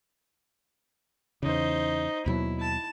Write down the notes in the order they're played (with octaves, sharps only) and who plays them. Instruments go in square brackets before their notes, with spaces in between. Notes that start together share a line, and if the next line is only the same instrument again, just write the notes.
[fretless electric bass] E2 C#3 [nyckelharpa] D#4 C5
[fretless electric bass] D#2 B2 F#3 [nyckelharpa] E4
[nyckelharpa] A5